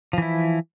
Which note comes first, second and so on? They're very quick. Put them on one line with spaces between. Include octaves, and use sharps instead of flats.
F3 E3 E4